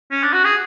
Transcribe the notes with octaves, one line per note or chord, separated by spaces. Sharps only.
C#4
D4
F#4
G#4